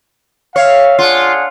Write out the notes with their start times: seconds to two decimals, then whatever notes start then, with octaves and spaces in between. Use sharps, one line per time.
0.56 C#5 E5 F5
0.99 D4 F4 G#4 F#5